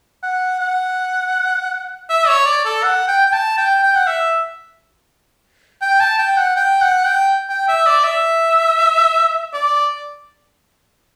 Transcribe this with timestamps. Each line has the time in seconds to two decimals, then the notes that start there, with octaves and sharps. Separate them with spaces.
0.23 F#5
0.60 F#5
2.10 E5
2.28 C#5
2.46 D5
2.65 A4
2.84 F#5
3.08 G5
3.26 G5
3.33 A5
3.58 G5
3.83 G5
3.95 F#5
4.07 E5
5.81 G5
6.00 A5
6.18 G5
6.37 F#5
6.56 G5
6.81 F#5
7.06 G5
7.49 G5
7.68 E5
7.86 D5
8.04 E5
9.53 D5